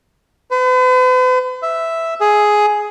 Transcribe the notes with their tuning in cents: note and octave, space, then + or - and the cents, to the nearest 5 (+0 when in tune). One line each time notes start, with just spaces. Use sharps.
B4 +45
E5 +0
G#4 +10